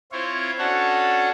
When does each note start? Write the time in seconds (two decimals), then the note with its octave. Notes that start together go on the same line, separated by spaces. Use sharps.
0.12 C4 E4 F4 C5 C#5
0.58 C#4 D4 F#4 A4 C#5 F#5